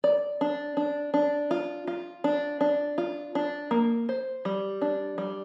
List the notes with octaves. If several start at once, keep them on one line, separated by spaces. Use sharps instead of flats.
D5
D4
D4
D4
F4
F4
D4
D4
F4
D4
A#3
C5
G3
D4
G3